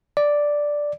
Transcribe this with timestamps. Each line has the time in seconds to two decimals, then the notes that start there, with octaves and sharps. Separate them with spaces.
0.17 D5